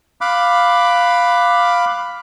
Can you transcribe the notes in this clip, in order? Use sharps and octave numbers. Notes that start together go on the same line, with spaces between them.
F5 B5 D6 F#6